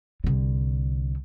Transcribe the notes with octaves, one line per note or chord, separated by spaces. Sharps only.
C2 D3